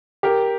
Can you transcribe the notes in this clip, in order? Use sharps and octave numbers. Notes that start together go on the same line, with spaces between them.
G4 A#4